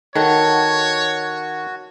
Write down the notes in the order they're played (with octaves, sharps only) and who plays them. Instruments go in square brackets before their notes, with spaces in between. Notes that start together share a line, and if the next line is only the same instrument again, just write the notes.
[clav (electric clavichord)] D#3 [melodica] F#4 [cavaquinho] A4 F#5 [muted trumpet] C#5